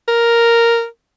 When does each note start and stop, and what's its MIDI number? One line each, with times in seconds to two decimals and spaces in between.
0.08 0.86 70